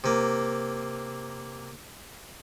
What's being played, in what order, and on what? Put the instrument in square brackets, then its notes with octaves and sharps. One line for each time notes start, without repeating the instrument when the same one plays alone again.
[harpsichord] C3 A#3